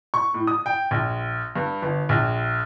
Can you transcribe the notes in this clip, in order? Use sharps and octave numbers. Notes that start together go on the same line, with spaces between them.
C#6
A2
D#6
G5
A#1
G2
G1
A#1